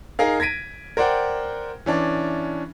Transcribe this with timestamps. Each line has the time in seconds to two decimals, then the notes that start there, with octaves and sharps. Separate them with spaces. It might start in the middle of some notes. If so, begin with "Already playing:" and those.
0.19 D#4 G#4 A#4 F5
0.40 G#6 A#6 B6 D7 D#7
0.97 A#4 C5 D5 F#5 G5
1.86 E3 C#4 D4